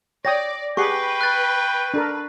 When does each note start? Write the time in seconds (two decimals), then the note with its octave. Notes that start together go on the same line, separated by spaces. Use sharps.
0.25 C#5 D5 G5 D#6 A#6
0.77 G4 G#4 B4 F#5 G5 C#6 C7
1.21 F#6 A6
1.94 D4 A4 A#4